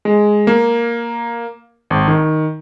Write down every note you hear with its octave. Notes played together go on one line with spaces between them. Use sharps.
G#3
A#3
G#1
D#3